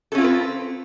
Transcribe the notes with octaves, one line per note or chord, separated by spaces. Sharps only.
C4 C#4 F4 A4 B4